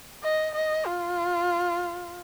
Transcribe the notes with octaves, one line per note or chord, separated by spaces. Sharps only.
D#5
D#5
F4